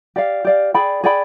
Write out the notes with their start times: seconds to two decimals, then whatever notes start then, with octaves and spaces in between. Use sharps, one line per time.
0.16 G4 D5 F5
0.45 G4 D5 F5
0.74 G#4 D5 G5 B5
1.04 G#4 D5 G5 B5